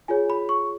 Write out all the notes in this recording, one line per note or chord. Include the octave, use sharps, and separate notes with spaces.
F4 G#4 C#5 G#5
B5
C#6